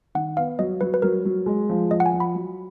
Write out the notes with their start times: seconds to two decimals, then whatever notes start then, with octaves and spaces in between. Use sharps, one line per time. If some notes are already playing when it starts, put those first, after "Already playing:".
0.15 D#3 F#5
0.37 B3 F5
0.59 F#3 D#5
0.81 F#3 B4
0.94 B4
1.02 F#3 A#4
1.25 F#3
1.46 G#3
1.69 F3
1.91 F3 D#5
2.00 F#5
2.06 G#5
2.13 F3
2.20 B5
2.35 F#3